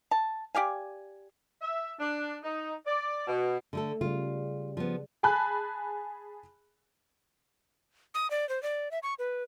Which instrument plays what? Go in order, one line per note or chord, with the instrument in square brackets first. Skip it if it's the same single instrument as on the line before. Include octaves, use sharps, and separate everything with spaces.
[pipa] A5
G4 D5 F5 G#5
[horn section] E5
D4
D#4
D5
B2
[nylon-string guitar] D3 A3 A4
[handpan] C#3 G3 [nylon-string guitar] F4
[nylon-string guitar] F3 B3
[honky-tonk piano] G#4 G#5 A5 B5 F#6
[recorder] D#6
D5
C5
D5
E5
C#6
B4